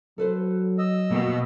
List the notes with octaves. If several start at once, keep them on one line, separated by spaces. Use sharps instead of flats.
F#3 A4 B4 C5
D#5 E6
B2 A#3 G5